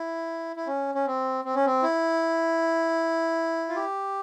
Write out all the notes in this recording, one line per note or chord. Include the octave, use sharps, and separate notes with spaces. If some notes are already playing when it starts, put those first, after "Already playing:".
Already playing: E4
E4
C#4
C#4
C4
C4
C#4
C4
E4
F4
G4